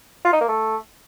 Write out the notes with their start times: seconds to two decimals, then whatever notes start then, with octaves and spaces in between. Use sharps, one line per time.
0.25 F4
0.33 D#4
0.41 A#3
0.49 A3